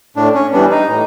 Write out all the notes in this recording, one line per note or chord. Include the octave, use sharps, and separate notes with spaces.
A2 D4
C#4
E3 G3 B3 D4
D#4
A2